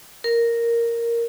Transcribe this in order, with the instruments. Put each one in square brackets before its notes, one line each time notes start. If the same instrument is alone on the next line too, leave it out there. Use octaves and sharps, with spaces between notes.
[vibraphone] A#4